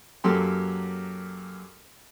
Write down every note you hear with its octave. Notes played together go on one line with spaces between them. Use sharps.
F#2 F#3 A#3 G4 A4 C6